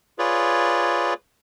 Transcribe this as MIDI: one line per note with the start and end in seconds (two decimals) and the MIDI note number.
0.19 1.14 65
0.19 1.14 68
0.19 1.14 71
0.19 1.14 73
0.19 1.14 74